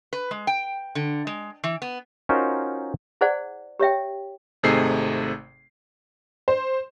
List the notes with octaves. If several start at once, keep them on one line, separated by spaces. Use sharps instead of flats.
B4
G#3
G5
D3
G#3
E3
B3
C#4 D#4 F4 F#4 A#4 C5
E4 G#4 C5 D5 F#5
G4 C#5 E5 G5
G#1 C3 A3 D#4 G#4 C7
C5